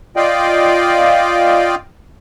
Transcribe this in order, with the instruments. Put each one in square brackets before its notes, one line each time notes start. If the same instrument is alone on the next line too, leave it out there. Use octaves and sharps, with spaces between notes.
[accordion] F4 D5 D#5 F5 G5